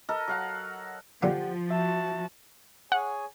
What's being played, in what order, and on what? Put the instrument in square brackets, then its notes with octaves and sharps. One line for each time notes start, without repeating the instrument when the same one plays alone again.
[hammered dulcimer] A4 A#4 D#5
F#3 F5 F#5
[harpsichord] A#1 D3 F4 [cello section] F3 [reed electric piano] G4 F#5
[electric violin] F#4 A5 [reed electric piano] E5
[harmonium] G#4 C#5 G#5 [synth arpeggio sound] F#5